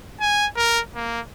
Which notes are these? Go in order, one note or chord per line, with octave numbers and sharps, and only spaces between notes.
G#5
A#4
A#3